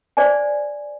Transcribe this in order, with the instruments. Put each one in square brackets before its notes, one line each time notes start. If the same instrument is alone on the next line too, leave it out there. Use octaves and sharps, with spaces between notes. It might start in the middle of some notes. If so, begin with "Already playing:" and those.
[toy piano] C5 D5 G#5